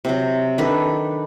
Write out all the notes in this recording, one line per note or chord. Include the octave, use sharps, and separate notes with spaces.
C3 F#3
D#3 D4 A4 B4